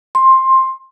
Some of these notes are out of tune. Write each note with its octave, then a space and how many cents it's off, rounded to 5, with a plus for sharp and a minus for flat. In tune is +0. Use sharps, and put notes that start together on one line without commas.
C6 +15